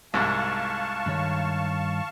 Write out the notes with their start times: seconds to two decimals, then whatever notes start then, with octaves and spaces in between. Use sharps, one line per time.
0.14 C2 G#2 F5 A5 C#6
1.06 G2 D#3 C#5